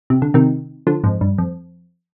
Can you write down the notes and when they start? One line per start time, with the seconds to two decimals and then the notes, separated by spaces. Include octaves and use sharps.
0.10 C3
0.22 D3
0.34 C3 D#3
0.87 D3 F3
1.04 F2 G#2
1.21 G2
1.38 F2